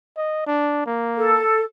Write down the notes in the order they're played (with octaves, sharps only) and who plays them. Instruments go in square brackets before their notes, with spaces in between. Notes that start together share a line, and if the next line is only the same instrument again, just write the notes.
[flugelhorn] D#5
D4
A#3
[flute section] A4